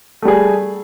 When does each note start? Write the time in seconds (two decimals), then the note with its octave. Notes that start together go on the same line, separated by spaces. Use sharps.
0.22 A3
0.25 G3
0.28 G#4